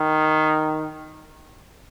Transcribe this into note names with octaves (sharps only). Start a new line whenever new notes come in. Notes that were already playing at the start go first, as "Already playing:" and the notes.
Already playing: D#3